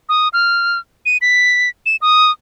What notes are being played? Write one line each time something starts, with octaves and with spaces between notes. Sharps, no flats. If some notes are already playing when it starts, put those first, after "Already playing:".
D#6
F6
D#7
B6
E7
D#6